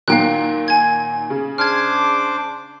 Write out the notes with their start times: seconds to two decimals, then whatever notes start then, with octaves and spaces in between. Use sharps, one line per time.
0.08 A#2 D#3 F#3 F5 G5 F#6
0.68 G#5 G#6
1.30 C#3
1.58 D4 C5 D6 F6 G#6